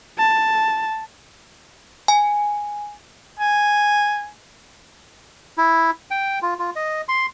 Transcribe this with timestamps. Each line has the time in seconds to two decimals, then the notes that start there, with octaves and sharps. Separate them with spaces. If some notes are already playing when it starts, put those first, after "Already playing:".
0.18 A5
2.08 G#5
3.39 G#5
5.58 E4
6.11 G5
6.42 F4
6.59 F4
6.76 D#5
7.09 C6